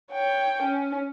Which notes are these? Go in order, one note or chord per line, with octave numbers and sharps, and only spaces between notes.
C#5 G5
C#4